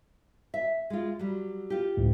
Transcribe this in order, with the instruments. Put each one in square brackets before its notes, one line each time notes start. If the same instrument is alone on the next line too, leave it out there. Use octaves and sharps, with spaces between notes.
[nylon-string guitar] E5
G#3 F4
F#3 G3
F4 G4
[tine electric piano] C#2 A2